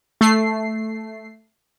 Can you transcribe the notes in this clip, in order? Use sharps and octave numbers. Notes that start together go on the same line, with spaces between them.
A3 C7